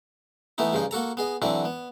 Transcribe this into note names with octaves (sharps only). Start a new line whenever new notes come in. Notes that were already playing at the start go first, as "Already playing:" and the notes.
E3 A3 B3 D#4 E4
G2 C#3 F3 D#4
A#3 F#4 A4 A#5
B3 G#4 D#5
D3 E3 F#3 C4 D4 E4
B3